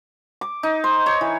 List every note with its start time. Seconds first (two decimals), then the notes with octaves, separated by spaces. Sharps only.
0.41 D6
0.63 D#4
0.84 C5
1.06 C#5
1.21 E3